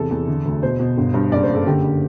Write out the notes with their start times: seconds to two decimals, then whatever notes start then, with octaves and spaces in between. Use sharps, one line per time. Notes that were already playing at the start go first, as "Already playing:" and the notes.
Already playing: E2 C3 A4
0.11 E2
0.28 D3
0.45 D2
0.63 B2 C5
0.79 B2
0.98 G1
1.14 G2
1.32 F#1 D5
1.43 C5
1.49 F#1
1.55 A4
1.67 D3 G4
1.84 D3